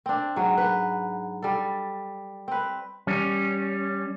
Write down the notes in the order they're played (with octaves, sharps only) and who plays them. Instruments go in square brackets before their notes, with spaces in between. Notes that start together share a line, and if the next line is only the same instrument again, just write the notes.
[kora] C4 D4
G#2 F#3
B4
G3 A4
C4 B4
[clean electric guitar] G3 C#4